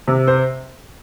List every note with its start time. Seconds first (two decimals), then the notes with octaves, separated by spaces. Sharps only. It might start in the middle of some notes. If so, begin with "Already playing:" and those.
0.08 C3
0.28 C5